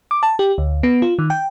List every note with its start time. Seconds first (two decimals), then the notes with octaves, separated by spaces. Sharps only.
0.11 D6
0.23 A5
0.39 G4
0.58 D2
0.83 B3
1.02 F4
1.19 D#3
1.30 G5